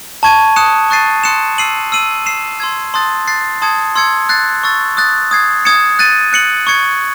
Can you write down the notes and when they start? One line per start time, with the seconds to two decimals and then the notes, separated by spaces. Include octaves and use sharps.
0.23 A5 C#6 G#6 D#7
0.56 D#6 F#6 C#7 E7
0.90 C#6 F#6 A6 C7 D#7
1.24 C6 D#6 F#6 C#7 E7
1.58 E6 C7 D#7 F#7
1.92 E6 C7 D#7 F#7
2.26 E6 C7 E7
2.60 C6 E6 G#6
2.94 A5 C6 D#6 F#6 A6
3.28 F#6 A6 C7
3.62 A5 C6 D#6 G#6 C#7
3.95 C6 E6 G#6 C#7
4.29 F#6 A6 C7
4.63 C#6 E6 A6
4.97 D#6 F#6 A6
5.31 D#6 G#6 C7
5.65 D#6 G#6 C#7 E7
5.99 F#6 A6 D#7
6.33 F#6 C#7 F#7
6.67 C#6 G#6 C#7